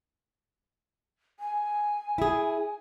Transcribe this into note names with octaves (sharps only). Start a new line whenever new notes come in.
G#5
E4 G#4